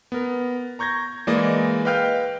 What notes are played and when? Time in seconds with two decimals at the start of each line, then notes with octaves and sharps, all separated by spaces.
0.12 B3 A#4
0.79 A#5 C#6 G6 G#6 A#6
1.27 E3 G#3 A#3 D5 D#5
1.85 B4 D#5 F5 G5 F6 G6